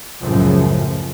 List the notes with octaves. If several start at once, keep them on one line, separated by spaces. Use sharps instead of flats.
C#2 F#2 A2 C#3 F3